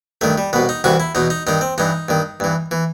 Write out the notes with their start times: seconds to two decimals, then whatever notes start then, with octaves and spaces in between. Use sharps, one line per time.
0.21 G2 D#3 A3
0.38 G3
0.53 C2 B2 B3
0.69 D#4
0.84 C2 C3 E3 F#4
1.00 E4
1.15 E2 B2 D#4
1.30 D#4
1.47 G2 D#3 D#4
1.61 C4
1.78 G2 E3 D#4
2.09 G2 D#3
2.40 G2 E3
2.71 E3